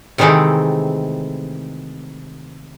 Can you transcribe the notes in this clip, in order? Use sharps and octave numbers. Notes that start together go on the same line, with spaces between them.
C3 D#3 E3 G#3 A3 C4